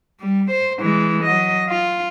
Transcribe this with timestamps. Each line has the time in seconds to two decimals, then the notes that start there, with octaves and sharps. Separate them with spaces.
0.20 G3
0.51 C5
0.79 E3 G#3
1.24 F#3 D#5
1.68 F4